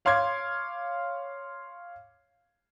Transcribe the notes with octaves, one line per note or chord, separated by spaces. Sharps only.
C#5 F5 C6 D6 G#6